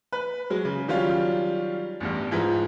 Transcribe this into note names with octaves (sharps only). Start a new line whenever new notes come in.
B4
F#3 G#3
C#3
D#3 F#3 G3 C#4 F4
A1 E2 G2
G#2 E3 F3